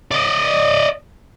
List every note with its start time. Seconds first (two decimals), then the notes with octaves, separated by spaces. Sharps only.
0.11 D5 D#5